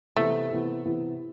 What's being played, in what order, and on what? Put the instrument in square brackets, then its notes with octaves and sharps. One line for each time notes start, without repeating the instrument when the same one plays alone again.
[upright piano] C3 E3 B3 E4 [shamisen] A3
[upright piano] C3 E3 B3 E4
C3 E3 B3 E4